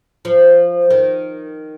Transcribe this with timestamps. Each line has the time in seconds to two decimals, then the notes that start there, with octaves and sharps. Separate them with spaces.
0.25 F3
0.90 D#3